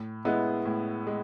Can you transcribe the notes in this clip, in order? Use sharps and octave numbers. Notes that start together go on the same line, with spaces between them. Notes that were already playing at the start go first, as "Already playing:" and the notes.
Already playing: A2
G#3 B3 E4
A2
G#3